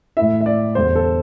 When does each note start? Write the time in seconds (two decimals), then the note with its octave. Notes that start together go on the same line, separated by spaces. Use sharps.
0.17 A2 A3 E4 E5
0.41 E5
0.46 D5
0.75 E2 D3 G3 D4 C5
0.96 A4